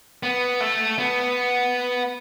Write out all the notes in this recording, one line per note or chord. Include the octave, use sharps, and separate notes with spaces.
B3
A3
B3